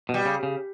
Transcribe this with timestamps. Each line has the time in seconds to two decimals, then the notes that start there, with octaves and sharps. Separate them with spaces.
0.09 B2 G3
0.25 C#3
0.43 C#3